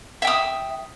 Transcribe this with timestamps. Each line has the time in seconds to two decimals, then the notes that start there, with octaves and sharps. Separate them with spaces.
0.22 E5
0.25 G5
0.27 D#6